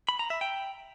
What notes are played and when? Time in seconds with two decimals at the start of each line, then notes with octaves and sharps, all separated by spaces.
0.09 B5
0.19 A#5
0.30 E5
0.41 G5